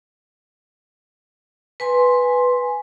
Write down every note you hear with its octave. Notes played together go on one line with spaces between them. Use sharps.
B4 G#5 C6